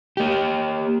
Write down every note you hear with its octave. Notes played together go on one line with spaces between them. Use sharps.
A#3 G4